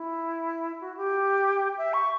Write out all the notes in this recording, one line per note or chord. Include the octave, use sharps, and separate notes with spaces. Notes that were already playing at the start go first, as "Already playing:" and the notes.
Already playing: E4
F#4
G4
E5
C#6